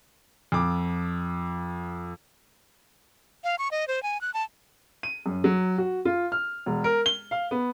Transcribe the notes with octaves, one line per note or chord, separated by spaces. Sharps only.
F2 D6
F5
C#6
D#5
C5
G#5
F#6
A5
D#7
F#2
F#3
F#4
F4
F6
E1
A#4
G7
F5
B3